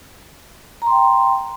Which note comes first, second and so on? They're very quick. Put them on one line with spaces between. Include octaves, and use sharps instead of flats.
A#5 C6 G5